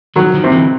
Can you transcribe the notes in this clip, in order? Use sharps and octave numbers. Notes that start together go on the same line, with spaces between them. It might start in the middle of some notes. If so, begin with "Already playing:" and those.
D#3 F3 F#3
D#3 F3
C3
D3 E3